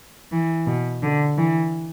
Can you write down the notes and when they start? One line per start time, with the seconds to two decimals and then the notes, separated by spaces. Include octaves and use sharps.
0.31 E3
0.67 B2
1.03 D3
1.38 E3